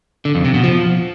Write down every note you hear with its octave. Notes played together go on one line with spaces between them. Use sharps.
D3
F2
C3
B2
F3